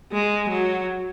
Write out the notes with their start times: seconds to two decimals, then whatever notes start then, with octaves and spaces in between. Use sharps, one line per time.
0.12 G#3
0.50 F#3